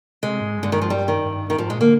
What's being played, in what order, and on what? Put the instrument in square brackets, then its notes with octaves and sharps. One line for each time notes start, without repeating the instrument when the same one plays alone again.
[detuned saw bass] C3 [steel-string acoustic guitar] G#3
[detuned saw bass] G#2
G2
[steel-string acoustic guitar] D3
D#3
F3
G3
D#3
[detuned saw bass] G2
[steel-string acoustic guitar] D#3
[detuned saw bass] G#2 [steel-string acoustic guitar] F3
[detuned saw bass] A#2 [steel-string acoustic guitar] G#3
[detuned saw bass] D3 [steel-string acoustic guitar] A#3